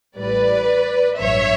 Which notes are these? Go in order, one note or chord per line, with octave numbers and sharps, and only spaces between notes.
A1 A2 G3 B4 D5
A1 G2 F#3 C#5 E5